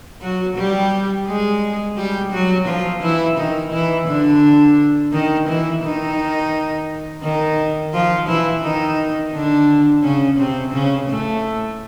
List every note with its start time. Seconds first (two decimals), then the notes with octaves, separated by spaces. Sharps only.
0.21 F#3 F#4
0.57 G3 G4
1.27 G#3 G#4
1.97 G3 G4
2.32 F#3 F#4
2.67 F3 F4
3.02 E3 E4
3.37 D#3 D#4
3.72 E3 E4
4.07 D3 D4
5.13 D#3 D#4
5.48 E3 E4
5.83 D#3 D#4
7.23 D#3 D#4
7.94 F3 F4
8.28 E3 E4
8.63 D#3 D#4
9.33 D3 D4
10.03 C#3 C#4
10.39 C3 C4
10.73 C#3 C#4
11.09 A2 A3